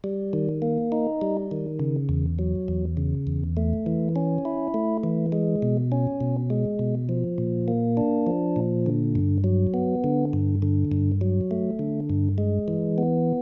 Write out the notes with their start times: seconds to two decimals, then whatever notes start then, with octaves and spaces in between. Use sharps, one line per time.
0.04 G3
0.33 D#3
0.62 A#3
0.92 D#4
1.21 G3
1.51 D#3
1.80 C#3
2.09 E2
2.39 F#3
2.68 E2
2.97 C#3
3.27 E2
3.57 A3
3.86 E3
4.16 C#4
4.45 E4
4.74 A3
5.04 E3
5.32 G#3
5.62 B2
5.92 C#4
6.21 B2
6.50 G#3
6.79 B2
7.09 F3
7.38 A#2
7.68 A#3
7.97 D4
8.27 F3
8.56 A#2
8.86 D3
9.15 G2
9.44 F#3
9.74 B3
10.04 D3
10.33 G2
10.62 D3
10.92 G2
11.21 F#3
11.51 A3
11.79 D3
12.10 G2
12.38 G#3
12.68 E3
12.98 B3